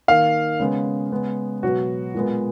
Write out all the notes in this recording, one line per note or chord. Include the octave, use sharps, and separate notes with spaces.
D#3 A#3 F5
C#3 G#3 B3
C#3 G#3 B3
B2 F#3 B3 F#4
A#2 G#3 B3